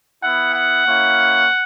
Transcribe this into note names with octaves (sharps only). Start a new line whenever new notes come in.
B3 E4 F#5
F#5
A#3 C#4 E4